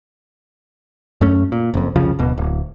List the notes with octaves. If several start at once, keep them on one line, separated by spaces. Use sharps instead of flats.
F#2 A3 C#4
A#2
F#1 F2
C2 F2 C#3 F3
D1 B2
D1